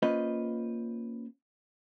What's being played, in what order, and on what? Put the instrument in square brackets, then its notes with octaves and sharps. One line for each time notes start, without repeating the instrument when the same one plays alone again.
[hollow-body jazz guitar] A#3 C#4 F4 B4 C5 D#5